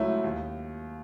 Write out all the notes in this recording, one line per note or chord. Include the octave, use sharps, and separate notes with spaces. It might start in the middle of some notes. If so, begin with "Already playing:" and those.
Already playing: C#2 F#3 A3 C#4 E4
D#2